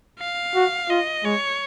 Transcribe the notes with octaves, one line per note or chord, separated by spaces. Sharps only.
F5
F#4
F4 D#5
G#3 C#5